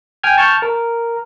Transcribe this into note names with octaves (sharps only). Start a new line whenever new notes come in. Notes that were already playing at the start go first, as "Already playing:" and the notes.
G5 G#5 F6 G#6
A5 C#6 F6 G6
A#4